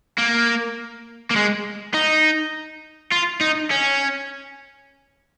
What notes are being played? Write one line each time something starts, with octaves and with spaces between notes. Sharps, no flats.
A#3
A#3
G#3
D#4
F4
D#4
C#4